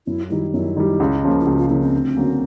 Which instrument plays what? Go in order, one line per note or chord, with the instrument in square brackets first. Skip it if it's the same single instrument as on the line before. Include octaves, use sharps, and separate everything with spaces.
[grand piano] F#2 [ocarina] E4
[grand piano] D#3 G3 [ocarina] E4
[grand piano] F#2 [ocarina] E4
[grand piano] D#3 G3
C#2
C#3 F3 A#3
[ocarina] E4
[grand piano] C#2 [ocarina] F4
[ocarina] F#4
F4
[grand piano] C#3 F3 A#3 [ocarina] E4
[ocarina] C4
[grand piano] D2
D3 F#3 A#3 C#4